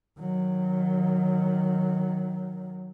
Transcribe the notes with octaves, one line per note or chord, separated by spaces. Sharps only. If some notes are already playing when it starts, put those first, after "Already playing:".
D#3 F#3